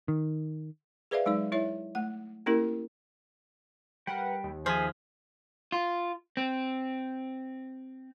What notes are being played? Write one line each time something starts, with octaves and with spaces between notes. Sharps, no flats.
D#3
G#4 B4 C5 D5 E5 F5
F#3 G#3 D#4 D5
E4 C#5 E5
A3 F#5
A#3 C#4 E4 G4 A#4
G3 A#4 B4 F#5 G5
D#2
F3 G#4 C5 E5 G#5
F4
C4